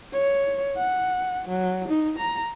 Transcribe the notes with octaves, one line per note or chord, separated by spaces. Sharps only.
C#5
F#5
F#3
D#4
A#5